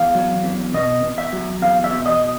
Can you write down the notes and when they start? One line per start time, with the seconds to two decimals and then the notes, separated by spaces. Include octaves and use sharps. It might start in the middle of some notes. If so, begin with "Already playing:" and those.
Already playing: E2 F5
0.15 F#3
0.44 E2
0.73 B2 D#5
1.03 E2
1.18 E5
1.33 F#3
1.62 E2 F5
1.84 E5
1.91 B2
2.06 D#5